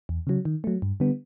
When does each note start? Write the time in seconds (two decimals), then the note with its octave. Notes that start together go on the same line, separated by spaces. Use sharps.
0.09 E2
0.27 C#3 F#3
0.45 D#3
0.64 F#3 A3
0.82 G2
1.00 D3 G3 B3